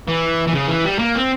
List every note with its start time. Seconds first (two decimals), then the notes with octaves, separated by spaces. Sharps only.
0.08 E3
0.47 E3
0.53 C#3
0.68 E3
0.85 G3
0.99 A#3
1.15 C4